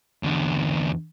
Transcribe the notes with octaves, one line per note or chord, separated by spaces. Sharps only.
E2 D3